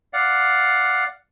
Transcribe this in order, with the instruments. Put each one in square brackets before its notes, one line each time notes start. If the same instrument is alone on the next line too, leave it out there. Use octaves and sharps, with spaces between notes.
[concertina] D5 F5 F#5